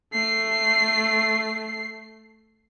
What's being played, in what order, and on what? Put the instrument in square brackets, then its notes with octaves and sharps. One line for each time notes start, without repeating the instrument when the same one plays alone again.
[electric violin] A3 C7